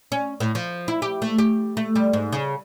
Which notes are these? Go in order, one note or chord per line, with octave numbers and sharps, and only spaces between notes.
C#4
A2
F3
E4
G4
A3
G4
A3
G3
G#2
C#3